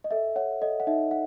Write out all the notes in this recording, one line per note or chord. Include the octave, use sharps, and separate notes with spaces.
D#5
A4 E5
C#5 F#5
A4 D#5
F#5
D#4 E5
F#5